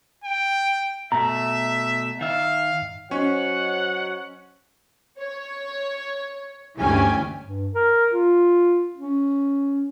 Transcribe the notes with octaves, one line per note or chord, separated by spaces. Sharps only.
G5
B2 A3 E5 A#5
D#3 E5 F5
F#3 C#4 C5 C#5 D#5 F#5
C#5
D2 G2 E3 C#4 G4 G#5
G2
A#4
F4
C#4